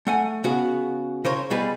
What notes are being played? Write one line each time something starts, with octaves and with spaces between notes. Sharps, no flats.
A3 F#5 G#5
C#3 B3 F#4
C#3 A#4 C5 C#5
B2 G3 G#4 B4